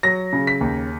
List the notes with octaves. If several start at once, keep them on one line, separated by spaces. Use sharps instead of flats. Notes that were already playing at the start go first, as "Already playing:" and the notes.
F#3 A#6
C#3
B6
D#2